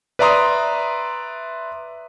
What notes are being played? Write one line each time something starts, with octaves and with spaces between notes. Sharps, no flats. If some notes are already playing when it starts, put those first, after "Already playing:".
B4 D5 E5 A#5 C6 D#6